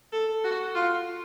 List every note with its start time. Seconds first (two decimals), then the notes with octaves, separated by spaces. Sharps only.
0.12 A4
0.44 F#4
0.74 F4